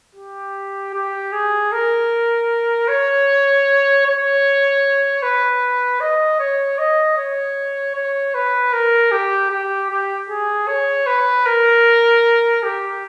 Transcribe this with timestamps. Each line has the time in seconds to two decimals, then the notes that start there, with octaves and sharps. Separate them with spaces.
0.15 G4
0.94 G4
1.32 G#4
1.72 A#4
2.88 C#5
4.06 C#5
5.23 B4
6.00 D#5
6.40 C#5
6.78 D#5
7.18 C#5
7.95 C#5
8.34 B4
8.73 A#4
9.11 G4
9.51 G4
9.90 G4
10.29 G#4
10.68 C#5
11.07 B4
11.46 A#4
12.63 G4